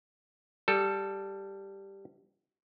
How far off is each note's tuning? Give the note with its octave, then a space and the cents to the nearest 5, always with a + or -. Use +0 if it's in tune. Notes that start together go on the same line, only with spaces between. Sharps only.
G3 +0 A4 +0